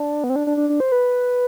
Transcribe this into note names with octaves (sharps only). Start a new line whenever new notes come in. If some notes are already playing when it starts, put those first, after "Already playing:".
Already playing: D4
B3
C4
D4
D4
D4
D4
C5
B4